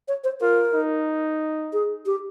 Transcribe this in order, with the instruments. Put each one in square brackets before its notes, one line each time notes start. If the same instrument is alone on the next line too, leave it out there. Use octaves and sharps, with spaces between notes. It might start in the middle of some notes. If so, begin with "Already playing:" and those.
[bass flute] C#5
C5
[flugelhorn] F4 [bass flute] A#4
[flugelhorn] D#4
[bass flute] G#4
G4